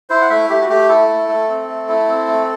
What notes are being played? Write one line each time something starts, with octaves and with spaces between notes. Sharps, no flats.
E4 C5
F#5
A3 E5
A3 G4
F#4
A3 G4
E4 A4
A3
A3
C4
A3
E4
C4
A3